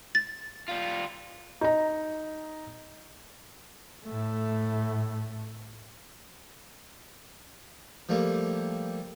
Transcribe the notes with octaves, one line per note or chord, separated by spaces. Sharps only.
A6
G3 F4
D#4 A#5
A2 A3
F3 G3 A3 A#3